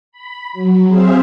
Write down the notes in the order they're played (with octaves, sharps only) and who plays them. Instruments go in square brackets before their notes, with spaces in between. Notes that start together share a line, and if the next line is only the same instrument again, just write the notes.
[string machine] B5
F#3
C4 G#4 C5 E5 F5